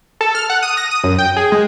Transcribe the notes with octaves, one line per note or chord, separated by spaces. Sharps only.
A4
F6
F#5
D#6
A#6
D#6
F#2
G5
G#4
G#3